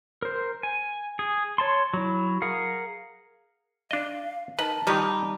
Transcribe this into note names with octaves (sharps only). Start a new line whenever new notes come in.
A#4 C5
G#5
G#4
C#5 A5 C6
F#3 E4
G#4 A#4 F5 F#5
D4 D#5 F5
D#3 B4 D#5 A5
D#3 F3 G3 D#4 G4